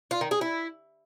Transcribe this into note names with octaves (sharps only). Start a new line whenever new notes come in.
F4
D#3
G#4
E4